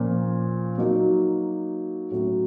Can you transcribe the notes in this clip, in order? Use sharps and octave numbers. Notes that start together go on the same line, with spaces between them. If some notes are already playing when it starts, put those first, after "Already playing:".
Already playing: A#2 F3 A#3 C#4
F#3 A#3 D#4 F#4
A2 F#3 A3 C#4